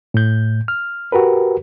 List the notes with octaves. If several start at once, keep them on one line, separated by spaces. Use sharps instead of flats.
A2 G6
F6
F#4 G4 A#4 B4